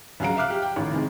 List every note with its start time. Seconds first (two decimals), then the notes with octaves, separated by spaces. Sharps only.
0.20 C#2 C#3 F#3 F5 A#5 D7
0.37 E5 F5 D6 F6 F#6
0.50 G4
0.62 G5
0.76 A1 D#3
0.91 C3 D#3 G#3